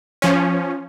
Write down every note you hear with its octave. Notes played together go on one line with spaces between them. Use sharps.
F3 C#4